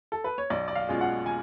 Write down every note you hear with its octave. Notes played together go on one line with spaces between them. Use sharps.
A4
B4
C#5
B1 D5
D5
F5
B2 G#3 C#4 F4
F#5
G#5